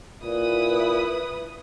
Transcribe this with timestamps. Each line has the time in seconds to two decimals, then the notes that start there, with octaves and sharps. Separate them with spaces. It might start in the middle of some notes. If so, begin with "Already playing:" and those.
0.24 A#2 E4 B4 D#6